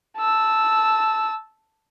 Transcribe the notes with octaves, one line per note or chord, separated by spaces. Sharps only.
A5 E6